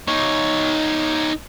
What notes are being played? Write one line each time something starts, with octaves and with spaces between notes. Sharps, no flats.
D#4 C#5